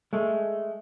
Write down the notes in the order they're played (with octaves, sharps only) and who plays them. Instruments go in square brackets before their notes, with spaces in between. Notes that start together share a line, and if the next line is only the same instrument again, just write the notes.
[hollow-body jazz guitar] G#3 A3